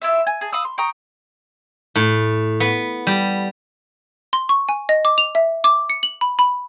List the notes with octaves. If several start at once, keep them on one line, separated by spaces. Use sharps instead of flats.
E4 F4 E5
G#5
G#4 G#5 A5
F5 B5 D#6 E6
C6
G5 A#5 C#6 D#6
A2
B3
G3
C6
C#6
G#5
D#5
D6
F7
E5
D6
C#7
F#7
B5
B5